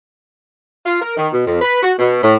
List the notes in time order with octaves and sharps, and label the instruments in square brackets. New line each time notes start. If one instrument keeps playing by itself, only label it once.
[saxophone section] F4
A#4
D#3
B2
F2
B4
F#4
B2
A2